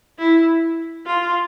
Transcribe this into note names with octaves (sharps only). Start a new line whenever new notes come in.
E4
F4